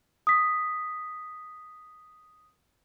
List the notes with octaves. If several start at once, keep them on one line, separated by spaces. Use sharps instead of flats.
D#6 B6